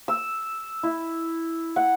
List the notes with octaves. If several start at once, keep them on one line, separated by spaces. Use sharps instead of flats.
E6
E4
F#5